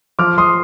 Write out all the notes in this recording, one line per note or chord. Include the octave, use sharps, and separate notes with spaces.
F3 D6 F6
F3 C6 D#6